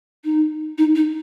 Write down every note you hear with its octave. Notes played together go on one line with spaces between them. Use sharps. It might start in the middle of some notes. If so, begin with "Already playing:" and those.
D#4
D#4
D#4